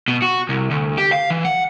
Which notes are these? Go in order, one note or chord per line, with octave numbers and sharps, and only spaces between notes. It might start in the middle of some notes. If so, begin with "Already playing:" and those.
B2
F#4
C2
D2
G4
F5
E3
F#5